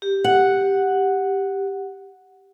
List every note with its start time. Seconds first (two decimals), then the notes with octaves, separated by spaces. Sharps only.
0.02 G4
0.24 F#5